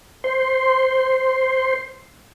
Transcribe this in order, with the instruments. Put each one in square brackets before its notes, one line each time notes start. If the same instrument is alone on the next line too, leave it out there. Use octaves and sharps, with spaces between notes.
[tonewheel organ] C5 C6